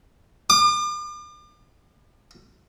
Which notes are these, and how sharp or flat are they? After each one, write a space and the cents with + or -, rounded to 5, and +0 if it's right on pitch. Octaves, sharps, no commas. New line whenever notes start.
D6 +40